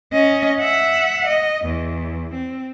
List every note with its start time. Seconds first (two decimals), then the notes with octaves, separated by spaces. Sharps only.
0.12 C#4 D#5
0.60 E5 F#5
1.27 D#5
1.65 E2
2.34 C4